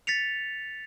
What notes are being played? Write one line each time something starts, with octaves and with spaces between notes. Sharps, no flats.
A6 B6 C#7 F7